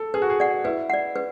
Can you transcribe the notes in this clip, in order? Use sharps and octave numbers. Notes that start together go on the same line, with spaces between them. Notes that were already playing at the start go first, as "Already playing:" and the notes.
Already playing: A4
G#4 B4
F#4
G#4
D5 F#5
E4 B4
D5 F#5
B4